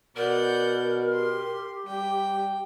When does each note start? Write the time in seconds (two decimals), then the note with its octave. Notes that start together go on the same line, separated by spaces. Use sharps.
0.16 B2 A#4 D5 F#5 G6
1.12 G4 C6
1.86 G3 G5